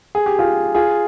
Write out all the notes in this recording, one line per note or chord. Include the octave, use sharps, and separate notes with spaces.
G#4
G4
F4 G#4
F4 G#4